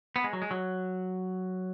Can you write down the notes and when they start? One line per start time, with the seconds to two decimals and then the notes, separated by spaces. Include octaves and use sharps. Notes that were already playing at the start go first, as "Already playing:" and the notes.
0.16 B3
0.24 G#3
0.33 F#3
0.42 G#3
0.51 F#3